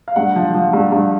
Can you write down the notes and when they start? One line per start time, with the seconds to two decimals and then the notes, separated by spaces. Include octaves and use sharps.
0.08 F5
0.16 G2 F#5
0.36 F3
0.54 F3
0.73 G2
0.92 G2